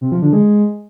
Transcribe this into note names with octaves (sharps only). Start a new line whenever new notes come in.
C3
F3
D3
G#3